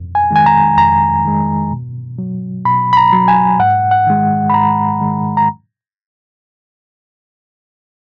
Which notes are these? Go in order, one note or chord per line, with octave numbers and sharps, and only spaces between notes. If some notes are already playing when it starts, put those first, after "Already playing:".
Already playing: F2
G#5
D#3 G#3 G#5
A#5
F2 A#5
D#3 G#3
B2
F#3
B2 B5
B5
A#5
F#3
G#5
G#2 F#5
F#5
D#3 G#3
B5
G#2 A#5
D#3 G#3
A#5